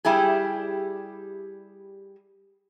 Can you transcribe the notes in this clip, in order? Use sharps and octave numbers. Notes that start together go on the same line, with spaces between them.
G3 E4 G4 G#4